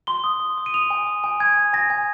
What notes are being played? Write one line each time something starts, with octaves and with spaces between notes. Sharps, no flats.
C6 G7
D#6
C6
D#6
D#7
D#6 F7
G#5
D#6
G#5
G#5 G#6
G#5
G#5 A#6
G#5